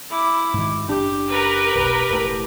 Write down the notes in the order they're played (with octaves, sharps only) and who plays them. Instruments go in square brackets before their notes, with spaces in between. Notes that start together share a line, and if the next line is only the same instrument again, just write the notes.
[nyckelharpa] E4 D6
[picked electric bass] G#2 D#3
[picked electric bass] F#1 D4 [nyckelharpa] G4
[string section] A#4 B4
[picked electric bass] F1 B1
E1 A2